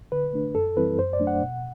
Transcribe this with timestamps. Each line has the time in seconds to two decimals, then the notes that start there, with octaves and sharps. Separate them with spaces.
0.12 D3 B4
0.33 A3 D4
0.55 F#2 A4
0.77 E3 G3 C4 E4 B4
0.98 F#2 C5
1.13 D5
1.20 F#3 A3 D4
1.27 F#5
1.42 B2